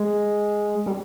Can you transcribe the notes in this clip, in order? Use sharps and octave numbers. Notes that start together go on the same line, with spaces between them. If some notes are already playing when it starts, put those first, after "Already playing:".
Already playing: G#3
G3